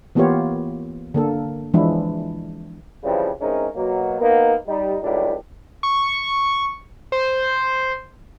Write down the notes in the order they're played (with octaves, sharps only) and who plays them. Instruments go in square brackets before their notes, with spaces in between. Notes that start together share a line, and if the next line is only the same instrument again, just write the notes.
[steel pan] E3 A#3 B3 F4 G4 C#5
D3 A#3 A4
E3 F3 G#3 D4 E4
[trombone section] C#3 E3 F3 G3 C4
G#3 C4 C#4 D#4 E4 A#4
B2 F#3 A#3
A#3 B3 D#4
G3 D#4
C#2 A2 F#3 G3 D4 G4
[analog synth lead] C#6
C5